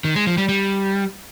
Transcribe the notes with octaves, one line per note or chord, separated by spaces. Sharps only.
D#3
G#3
F3
G3
G3